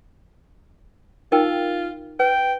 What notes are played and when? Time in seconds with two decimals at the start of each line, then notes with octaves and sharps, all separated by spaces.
1.32 D#4 F4 A#4 G5
2.20 B4 G5